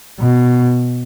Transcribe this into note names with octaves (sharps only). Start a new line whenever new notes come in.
B2